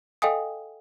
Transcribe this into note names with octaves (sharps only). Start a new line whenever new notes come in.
A4 D#5 F5 G5 G#5 D#6